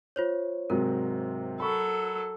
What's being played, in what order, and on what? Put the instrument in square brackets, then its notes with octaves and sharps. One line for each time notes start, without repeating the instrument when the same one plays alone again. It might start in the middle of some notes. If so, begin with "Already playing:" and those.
[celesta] F4 C5 C#5
[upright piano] G#2 C3 F#3 [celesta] A#4
[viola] F#3 A4 [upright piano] B5 C#6